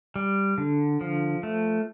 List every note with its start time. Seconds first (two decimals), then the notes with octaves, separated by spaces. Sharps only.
0.16 G3
0.58 D3
1.01 F3
1.43 A3